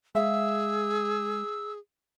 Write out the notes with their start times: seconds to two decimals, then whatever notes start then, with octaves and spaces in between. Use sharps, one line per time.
0.15 G#3 G#4 E5 F5 E6